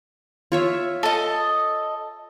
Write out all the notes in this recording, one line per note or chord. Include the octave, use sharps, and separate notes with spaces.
F4 C#5 E5
A4 D#5